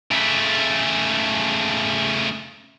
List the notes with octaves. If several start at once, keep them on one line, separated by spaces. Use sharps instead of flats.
C#3 A3